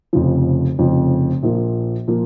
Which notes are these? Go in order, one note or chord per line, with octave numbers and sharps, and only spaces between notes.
F1 F2 C#3 F3
F1 F2 C#3 F3
A#1 A#2 F3 A#3
A#2 F3 A#3